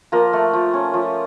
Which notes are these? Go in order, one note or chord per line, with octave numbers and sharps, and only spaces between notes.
F3 A#3 A#4
A3
F3
C#4
F3